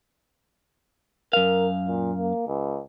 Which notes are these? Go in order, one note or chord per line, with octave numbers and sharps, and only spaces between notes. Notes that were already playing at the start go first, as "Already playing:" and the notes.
F#2 A#4 F5
A#2
A#3
C#2